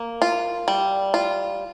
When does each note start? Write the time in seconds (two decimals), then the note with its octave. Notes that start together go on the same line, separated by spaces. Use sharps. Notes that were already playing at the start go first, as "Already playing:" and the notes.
Already playing: A#3
0.22 F4
0.68 G3
1.14 F4